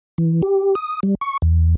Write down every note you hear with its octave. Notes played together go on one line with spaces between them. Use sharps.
E3
G4
D#6
G3
C#6
E2